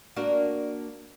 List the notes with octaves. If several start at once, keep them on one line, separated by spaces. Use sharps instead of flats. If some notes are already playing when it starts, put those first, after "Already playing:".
A#3 D4 F#4